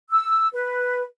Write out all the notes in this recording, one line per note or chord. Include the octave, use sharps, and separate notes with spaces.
E6
B4